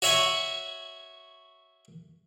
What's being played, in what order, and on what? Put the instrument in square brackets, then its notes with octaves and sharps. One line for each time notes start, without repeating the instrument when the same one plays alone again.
[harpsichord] F#4 C#5 E5 F#5 G#5